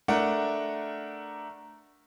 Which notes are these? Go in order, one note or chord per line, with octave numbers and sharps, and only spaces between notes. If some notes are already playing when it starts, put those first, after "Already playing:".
A3 D4 A#4 F#5